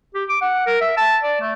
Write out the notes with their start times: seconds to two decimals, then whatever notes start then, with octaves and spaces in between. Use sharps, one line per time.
0.15 G4
0.29 D6
0.41 F#5
0.66 A#4
0.81 E5
0.97 A5
1.23 D5
1.41 A3